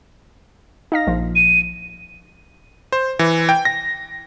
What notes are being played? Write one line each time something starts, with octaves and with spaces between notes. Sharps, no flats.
D#4 F5 A#6
A#1 F3
D#7
C5
E3
G5
A#6